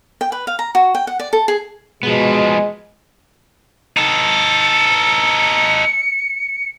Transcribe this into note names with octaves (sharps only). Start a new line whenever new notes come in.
G5
B4
F5
A#5
F#4
G5
F#5
D5
A4
G#4
B2 F3 G#3 B3
D#4 A4 C#7